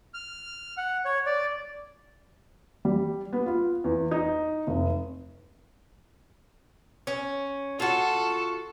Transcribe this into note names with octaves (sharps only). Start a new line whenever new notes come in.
F6
F#5
C#5
D5
G3
B3
F4
E2
D#4
F1
C#4
F4 F#4 A4